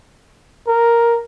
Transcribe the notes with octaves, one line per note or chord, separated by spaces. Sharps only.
A#4